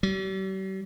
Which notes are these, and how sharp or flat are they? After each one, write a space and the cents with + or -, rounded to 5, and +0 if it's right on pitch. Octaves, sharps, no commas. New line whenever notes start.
G3 -45